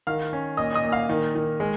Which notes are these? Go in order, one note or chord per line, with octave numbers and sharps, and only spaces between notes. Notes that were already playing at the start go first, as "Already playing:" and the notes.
D#3 F5 F6
C#4
A#2 D#5 D#6
D#5 D#6
A#2
F5 F6
D#3
D#3
G#3